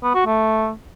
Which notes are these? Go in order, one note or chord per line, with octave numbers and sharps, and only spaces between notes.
B3
F#4
A3